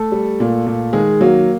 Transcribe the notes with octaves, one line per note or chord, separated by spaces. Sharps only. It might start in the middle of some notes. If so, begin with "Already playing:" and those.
Already playing: A3 A4
G3
A#2
A#2
D#3 G#3 G#4
F#3 A#3 F#4